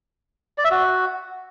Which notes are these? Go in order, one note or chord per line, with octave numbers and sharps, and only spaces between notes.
D5
E5
F#4